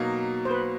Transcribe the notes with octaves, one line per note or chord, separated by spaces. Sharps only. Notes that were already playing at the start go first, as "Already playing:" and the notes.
Already playing: B2 F#3 A#3 D#4
C5
B4